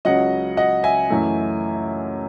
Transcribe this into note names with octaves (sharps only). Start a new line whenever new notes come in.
C#2 C#3 F#3 D#5 F#5
D#5 F#5
E5 G#5
F#2 E3 A3